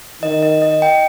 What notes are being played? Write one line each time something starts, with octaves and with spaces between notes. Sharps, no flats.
D#3 D#5
D#5
D#5
G5